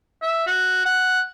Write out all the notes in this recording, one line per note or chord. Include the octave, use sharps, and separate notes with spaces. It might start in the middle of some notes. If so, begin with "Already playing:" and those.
E5
F#4
F#5